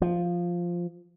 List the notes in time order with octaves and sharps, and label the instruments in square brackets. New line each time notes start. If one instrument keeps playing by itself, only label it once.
[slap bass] F3